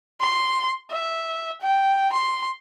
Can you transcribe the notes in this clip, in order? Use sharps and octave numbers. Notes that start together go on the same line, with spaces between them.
C6
E5
G5
C6